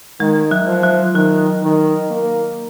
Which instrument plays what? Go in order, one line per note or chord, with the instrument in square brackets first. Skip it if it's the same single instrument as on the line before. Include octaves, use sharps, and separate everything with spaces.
[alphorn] D#3 [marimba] G#3
[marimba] F#3
[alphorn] F3
[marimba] F#3
[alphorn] D#3 [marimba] F#3
[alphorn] D#3
A#3